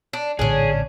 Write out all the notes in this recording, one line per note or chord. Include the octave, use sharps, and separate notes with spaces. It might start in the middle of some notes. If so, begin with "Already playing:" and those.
D4
A#1 A2 D3 C#4 D4 G#4